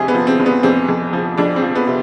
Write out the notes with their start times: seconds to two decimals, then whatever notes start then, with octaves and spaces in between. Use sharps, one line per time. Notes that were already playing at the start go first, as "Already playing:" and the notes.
Already playing: F1 F2 C3 G#4
0.08 B3
0.14 F3
0.27 C4
0.39 F1
0.46 B3
0.63 F2 C4
0.89 F2
1.13 F3
1.37 F2 D4
1.56 C4
1.62 F3
1.75 B3
1.87 C3